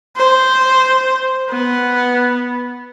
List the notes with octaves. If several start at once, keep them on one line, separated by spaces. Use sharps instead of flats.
C5
B3